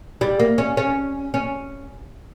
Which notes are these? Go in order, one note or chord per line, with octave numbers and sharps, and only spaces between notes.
G3
A#3
C#4
C#4
C#4